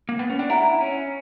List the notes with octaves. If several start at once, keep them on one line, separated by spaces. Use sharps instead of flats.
A#3
B3
C#4
D4 G5
E4 F#5 A#5
C#4